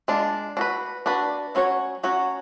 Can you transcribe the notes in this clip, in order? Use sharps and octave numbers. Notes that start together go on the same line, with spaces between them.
G#3 D4 F4
D4 F#4 B4
D4 F#4 B4
F#3 C#4 F#4 C#5
F#3 C#4 F#4 C#5